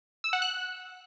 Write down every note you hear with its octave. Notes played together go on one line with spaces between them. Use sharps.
E6
F#5
F#6